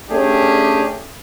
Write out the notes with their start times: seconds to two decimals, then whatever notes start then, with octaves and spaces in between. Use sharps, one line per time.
0.10 A3 C#4 D4 G4 G#4